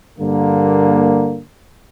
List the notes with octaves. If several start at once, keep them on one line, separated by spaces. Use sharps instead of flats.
G2 D3 A#3